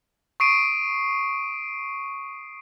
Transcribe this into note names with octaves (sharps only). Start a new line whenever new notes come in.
C#6 D#6 C7 D7 D#7